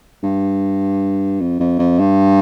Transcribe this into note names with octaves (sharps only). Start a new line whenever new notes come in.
G2
F2
F2
F2
G2